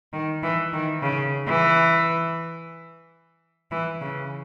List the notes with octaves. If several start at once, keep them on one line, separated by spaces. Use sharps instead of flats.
D#3
E3
D#3
C#3
E3
E3
C#3